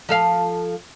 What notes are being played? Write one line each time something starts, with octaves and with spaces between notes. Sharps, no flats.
F3 A4 F5